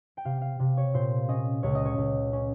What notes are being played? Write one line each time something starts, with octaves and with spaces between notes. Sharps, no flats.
G5
C3 F5
F5
C3
C#5
A#2 C5
C#4 D#5
C#2 C#5
D#5
C#5
C#2
C#4